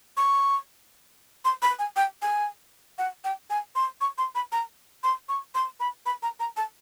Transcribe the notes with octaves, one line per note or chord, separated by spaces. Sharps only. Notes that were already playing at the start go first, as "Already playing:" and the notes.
C#6
C6
B5
G#5
G5
G#5
F#5
G5
G#5
C6
C#6
C6
B5
A#5
C6
C#6
C6
B5
B5
A#5
A#5
A5